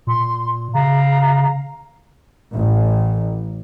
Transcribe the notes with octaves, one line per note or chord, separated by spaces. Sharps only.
A#2 C6
C#3 F5 A#5
A1